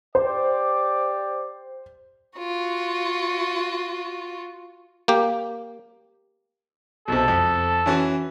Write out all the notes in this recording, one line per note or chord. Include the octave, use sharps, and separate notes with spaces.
G4 C5 D5
F4 F#4
A#3 G4
B1 C3 A4
F2
E3 C#4 F#4